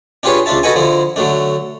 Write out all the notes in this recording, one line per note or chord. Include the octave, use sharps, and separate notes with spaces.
D4 F4 G4 G#4 B4 C#5
C#2 D4 F4 E5 A5
F#4 A4 B4 D#5 F#5 G#5
D3 F3 E4
D3 F#3 A3 D4